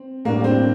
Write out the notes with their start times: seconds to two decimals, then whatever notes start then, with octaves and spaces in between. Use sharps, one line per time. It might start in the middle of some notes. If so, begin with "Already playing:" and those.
Already playing: C4
0.25 A2 G3 A#3 D4
0.44 C4